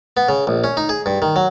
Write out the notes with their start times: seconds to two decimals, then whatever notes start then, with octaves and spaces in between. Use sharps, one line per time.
0.17 B3
0.28 C#3
0.47 A#1
0.64 C#4
0.77 D#4
0.89 G#4
1.06 G2
1.22 D#3
1.36 F#3